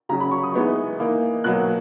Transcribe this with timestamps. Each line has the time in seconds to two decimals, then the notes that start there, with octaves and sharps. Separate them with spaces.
0.09 C#3 F#3 C#4 A#5
0.20 B5
0.31 C#6
0.43 D#6
0.54 E3 G#3 B3 D#4
0.99 E3 A#3 D#4
1.44 B2 F#3 A#3 F#6